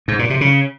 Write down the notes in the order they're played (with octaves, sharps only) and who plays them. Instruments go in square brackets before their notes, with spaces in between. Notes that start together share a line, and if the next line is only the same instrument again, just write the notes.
[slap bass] G#2
A#2
C3
C#3